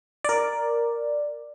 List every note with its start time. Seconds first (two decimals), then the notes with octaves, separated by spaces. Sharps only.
0.24 A#4 D5